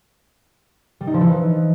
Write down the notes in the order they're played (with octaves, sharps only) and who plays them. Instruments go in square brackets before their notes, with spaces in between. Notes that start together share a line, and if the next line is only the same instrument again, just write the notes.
[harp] G3
D#4
F3
E3
D#4